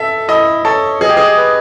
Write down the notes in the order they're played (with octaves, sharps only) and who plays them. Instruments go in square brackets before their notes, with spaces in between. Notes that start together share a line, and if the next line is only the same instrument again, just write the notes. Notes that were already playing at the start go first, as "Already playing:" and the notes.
Already playing: [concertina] A4 [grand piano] E5
[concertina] E4 [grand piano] D#5
[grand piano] A4 [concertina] C#5
[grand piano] G#4 [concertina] D#5
[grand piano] G4
G#4
[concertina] B4